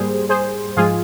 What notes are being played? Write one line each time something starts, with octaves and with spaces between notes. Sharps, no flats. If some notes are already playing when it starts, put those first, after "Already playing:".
Already playing: G#2 G3 A#3 G#4 C5
G#4 C5
G#2 F3 G#3 F4 G#4